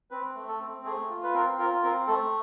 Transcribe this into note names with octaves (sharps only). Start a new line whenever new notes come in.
C4 B4
A3
A4
C4
A3 G#4
F4
B4
C4 A#4
F4 A#4
C4 A#4
A3 A4